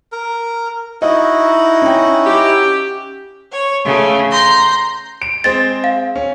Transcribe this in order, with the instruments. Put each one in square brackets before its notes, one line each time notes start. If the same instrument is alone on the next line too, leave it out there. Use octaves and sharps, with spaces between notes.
[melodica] A#4
[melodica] D#4 E4 F#4 [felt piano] D#5
[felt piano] C#4 G5
[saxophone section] G4
[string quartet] C#5
C#3 A3
A#5 C6 G6
[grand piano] D7
[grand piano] G#3 C4 C5 [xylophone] A6
[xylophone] F5
[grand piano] C#4